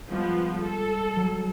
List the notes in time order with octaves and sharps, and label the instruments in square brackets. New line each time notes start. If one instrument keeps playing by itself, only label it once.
[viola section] F3 B3 [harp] G3 G#3
[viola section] A4
[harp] F#3